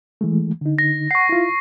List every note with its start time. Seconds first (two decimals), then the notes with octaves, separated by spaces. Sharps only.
0.21 E3 G#3 A3
0.61 D3 D#4
0.79 A#6
1.11 F#5 C#6 C7
1.29 E4 F4